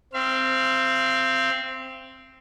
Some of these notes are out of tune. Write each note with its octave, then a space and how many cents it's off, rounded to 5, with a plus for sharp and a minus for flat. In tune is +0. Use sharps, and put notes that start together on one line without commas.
C4 +0 F5 -40